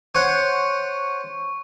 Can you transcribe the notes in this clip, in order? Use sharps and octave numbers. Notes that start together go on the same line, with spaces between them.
C5 C#5 F#5 C#6